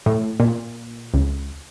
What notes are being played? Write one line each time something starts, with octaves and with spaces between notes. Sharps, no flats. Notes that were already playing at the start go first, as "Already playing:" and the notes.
A2
A#2
C#2